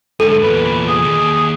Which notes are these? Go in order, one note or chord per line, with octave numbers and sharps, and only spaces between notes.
G#2 D3 A4 D#7
E2 A#2 B4
G#4
D#2